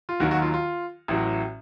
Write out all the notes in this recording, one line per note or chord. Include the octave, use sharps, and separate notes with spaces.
F4
D#2 D#3 F#3 F#4
F#4
F4
F4
A1 A2 F#3